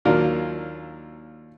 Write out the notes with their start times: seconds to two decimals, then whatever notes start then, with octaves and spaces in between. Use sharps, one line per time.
0.05 D#2 F#3 D4 F4 A#4